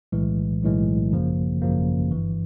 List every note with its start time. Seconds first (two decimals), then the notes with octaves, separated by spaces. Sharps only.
0.12 B1 A2 E3 G#3
0.62 B1 A2 E3 G#3
1.12 G#1 F#2 C#3 F3 A#3
1.62 G#1 F#2 C#3 F3 A#3
2.11 G1 G2 E3